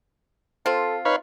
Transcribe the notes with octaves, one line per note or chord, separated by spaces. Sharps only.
C4 F4 A4
D#4 B4 C#5 F5